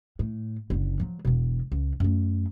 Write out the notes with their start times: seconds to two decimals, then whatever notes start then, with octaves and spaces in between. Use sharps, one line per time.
0.19 A2
0.70 F#1 D3
1.00 F3 F#3
1.25 E1 B2
1.72 C#2
2.00 F#2 A3